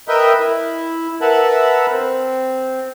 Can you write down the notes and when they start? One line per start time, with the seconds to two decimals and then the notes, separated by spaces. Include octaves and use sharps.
0.08 A#4 B4 D#5 E5 G5
0.39 E4
1.21 A#4 B4 E5 F#5 A5 B5
1.90 C4